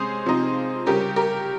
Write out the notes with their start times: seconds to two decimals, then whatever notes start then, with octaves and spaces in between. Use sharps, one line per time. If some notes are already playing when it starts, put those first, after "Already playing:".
Already playing: C3 G#3 C#4 G#4 C5
0.26 C3 F3 C4 D#4
0.86 C#3 G3 C#4 G4 A#4
1.16 G4 A#4